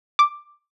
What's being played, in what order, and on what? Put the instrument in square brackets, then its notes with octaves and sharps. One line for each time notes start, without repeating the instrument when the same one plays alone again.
[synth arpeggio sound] D6